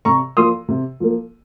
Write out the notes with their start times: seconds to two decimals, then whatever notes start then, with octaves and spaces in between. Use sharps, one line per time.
0.05 C3 A#5 C#6
0.37 F3 A#3 C6 D#6
0.68 C3
1.00 F3 A#3